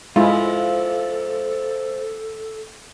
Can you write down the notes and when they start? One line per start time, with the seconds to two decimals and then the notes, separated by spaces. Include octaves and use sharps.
0.16 G#2 C3 F3 G#3 E4 F4 A4